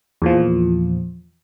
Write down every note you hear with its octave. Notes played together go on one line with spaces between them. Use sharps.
E2 A#2 F3